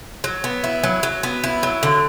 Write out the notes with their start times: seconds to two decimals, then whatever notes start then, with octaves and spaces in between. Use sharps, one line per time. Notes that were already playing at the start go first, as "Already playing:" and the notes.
0.24 F#3
0.44 B3
0.64 E4
0.84 F#3
1.03 F#3
1.23 B3
1.44 E4
1.63 F#3
1.83 D3